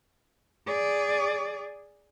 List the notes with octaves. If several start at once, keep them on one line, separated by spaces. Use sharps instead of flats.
G#4 D5